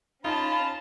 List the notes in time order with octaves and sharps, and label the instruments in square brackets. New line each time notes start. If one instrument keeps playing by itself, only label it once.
[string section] C#4 A5 [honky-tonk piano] D#4 [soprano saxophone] F4 [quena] B5